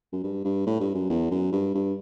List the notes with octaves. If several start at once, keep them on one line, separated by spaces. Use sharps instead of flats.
F#2
G2
G2
A2
G2
F#2
E2
F#2
G2
G2